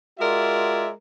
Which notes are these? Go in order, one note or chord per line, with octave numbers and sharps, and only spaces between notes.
G#3 F4 F#4 A#4 D5 E5